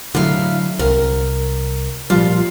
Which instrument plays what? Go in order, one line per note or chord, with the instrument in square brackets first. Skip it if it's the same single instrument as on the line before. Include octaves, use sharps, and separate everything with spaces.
[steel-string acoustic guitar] A2 E5 F5 [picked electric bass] D3 F3 F#3
[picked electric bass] C2 [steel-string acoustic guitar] A#4
[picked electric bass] A#2 F3 G3 [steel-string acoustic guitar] F4